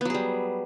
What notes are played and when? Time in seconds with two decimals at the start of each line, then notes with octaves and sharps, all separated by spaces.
0.01 B3
0.05 F#3
0.10 G#4
0.14 G3